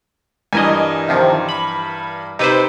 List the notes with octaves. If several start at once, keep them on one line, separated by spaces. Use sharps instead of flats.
G2 E3 A#4 D#5 G#5
C3 D#3 F3
B5
C3 D#4 B4 C5